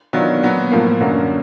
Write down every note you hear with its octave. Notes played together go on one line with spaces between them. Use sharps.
D#3 F#3 B3 D4 F4
A#2 F#3 B3
A2 F3 A#3
F#2 D3 F#3 A#3 C#4